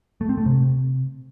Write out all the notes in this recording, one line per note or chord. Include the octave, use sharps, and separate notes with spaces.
A3
C4
A3
C3